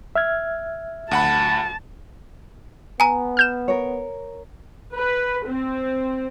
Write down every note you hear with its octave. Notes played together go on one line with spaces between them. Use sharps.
E5 F6 G#6
D2 F#5 A5 B5
B3 G#5 A#5
F6 G6 E7
A#4 C#5
B4
C4